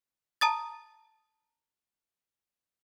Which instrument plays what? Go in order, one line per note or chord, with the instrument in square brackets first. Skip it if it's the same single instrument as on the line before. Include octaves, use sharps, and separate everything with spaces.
[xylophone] A5 A#5 D#6 A6